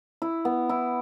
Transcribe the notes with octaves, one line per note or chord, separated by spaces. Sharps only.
E4
B3
E4